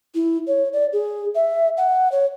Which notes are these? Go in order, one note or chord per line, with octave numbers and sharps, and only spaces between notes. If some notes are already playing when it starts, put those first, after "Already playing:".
E4
C#5
D5
G#4
E5
F#5
C#5